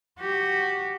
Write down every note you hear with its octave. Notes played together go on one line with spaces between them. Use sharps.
F#4 G4